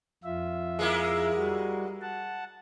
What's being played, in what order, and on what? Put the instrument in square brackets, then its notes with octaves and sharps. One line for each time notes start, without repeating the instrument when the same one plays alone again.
[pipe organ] F2 F4 E5
[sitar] G#3 A#3 E4
[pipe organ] G3 F#4
F#5 A5